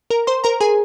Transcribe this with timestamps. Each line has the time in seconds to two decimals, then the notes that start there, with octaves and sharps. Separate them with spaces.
0.10 A#4 A#5
0.27 C5 C6
0.44 A#4 A#5
0.61 G#4 G#5